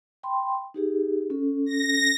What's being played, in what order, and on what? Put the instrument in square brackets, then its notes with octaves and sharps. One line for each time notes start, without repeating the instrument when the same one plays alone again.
[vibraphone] G5 B5 C6
D#4 G4 G#4
C#4 A4
[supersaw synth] A#6